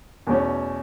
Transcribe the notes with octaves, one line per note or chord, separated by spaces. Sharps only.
E2 B2 A3 C#4